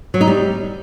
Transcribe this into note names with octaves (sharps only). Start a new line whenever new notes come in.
F#3
D#4
G3